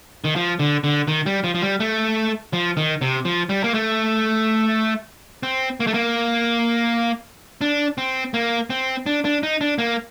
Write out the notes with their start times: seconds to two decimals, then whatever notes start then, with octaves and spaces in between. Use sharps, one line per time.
0.25 D#3
0.36 F3
0.59 D3
0.84 D3
1.08 D#3
1.26 G3
1.44 F3
1.55 F3
1.62 G3
1.80 A3
2.53 F3
2.77 D#3
3.02 C3
3.25 F3
3.49 G3
3.64 A#3
3.74 A3
5.43 C4
5.80 A#3
5.87 A3
5.94 A#3
7.61 D4
7.98 C4
8.34 A#3
8.70 C4
9.06 D4
9.25 D4
9.43 D#4
9.61 D4
9.78 A#3